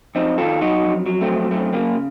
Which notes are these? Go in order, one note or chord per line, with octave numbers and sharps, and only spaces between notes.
F2 C4 D#4
D#3 F4 A4
F#3 D#4 F#4
F2
F#3
A3 C4
F2
F#2 A3 C4
C#3 A#3